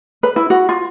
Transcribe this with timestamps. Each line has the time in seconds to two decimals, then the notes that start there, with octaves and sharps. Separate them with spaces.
0.23 B4
0.36 E4
0.50 F#4
0.69 F4